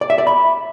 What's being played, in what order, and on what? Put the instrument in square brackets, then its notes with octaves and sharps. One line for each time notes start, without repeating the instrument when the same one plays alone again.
[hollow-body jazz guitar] D5
E5
D5
B5